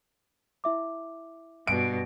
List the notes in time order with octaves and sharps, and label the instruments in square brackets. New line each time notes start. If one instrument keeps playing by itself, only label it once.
[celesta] E4 E5 D6
[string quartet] G2 B2 [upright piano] D7